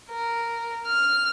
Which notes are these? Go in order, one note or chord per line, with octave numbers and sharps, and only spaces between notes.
A#4
F6